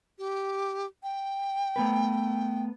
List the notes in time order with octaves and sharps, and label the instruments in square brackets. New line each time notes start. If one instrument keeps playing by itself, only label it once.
[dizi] G4
G5
[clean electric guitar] A3 B3 B4